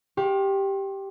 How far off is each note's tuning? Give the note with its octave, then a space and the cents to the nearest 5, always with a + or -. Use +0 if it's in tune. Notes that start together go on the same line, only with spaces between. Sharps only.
G4 +0 F5 +35 C6 +40